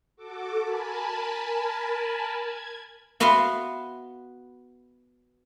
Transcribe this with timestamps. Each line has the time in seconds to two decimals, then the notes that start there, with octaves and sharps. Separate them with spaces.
0.16 F#4 A4 D6
0.61 A#4 G#5 A5 B5
2.33 G#6
3.20 B3 F#4 B4 E5 F5 C6